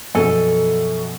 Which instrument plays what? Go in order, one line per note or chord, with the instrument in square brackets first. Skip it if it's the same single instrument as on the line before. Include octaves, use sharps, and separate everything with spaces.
[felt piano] F#2 B2 F3 [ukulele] A4 G#5